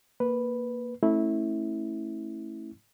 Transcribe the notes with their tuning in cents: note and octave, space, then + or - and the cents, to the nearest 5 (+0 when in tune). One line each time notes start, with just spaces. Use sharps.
A#3 +0 B4 +0
A3 +0 C#4 -40 E4 -15